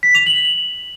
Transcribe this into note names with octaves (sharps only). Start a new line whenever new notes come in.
B6
F7
F#7